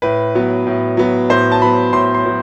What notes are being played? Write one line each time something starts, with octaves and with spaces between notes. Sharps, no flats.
A2 B4
F#3 B3
A2
F#3 B3
A2 C5
A5
F#3 B3 B5
A2 C6
C6
F#3 B3